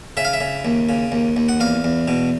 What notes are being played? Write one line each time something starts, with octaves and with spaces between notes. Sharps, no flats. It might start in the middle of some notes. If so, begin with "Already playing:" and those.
C#3 E5
F5
E5
C#3
D#2
C#3
D#2
D#2
F#5
E2 F5
E2
B2